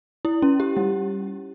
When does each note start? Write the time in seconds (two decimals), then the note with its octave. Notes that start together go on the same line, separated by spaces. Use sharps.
0.25 E4
0.42 C#4
0.60 G4
0.77 G3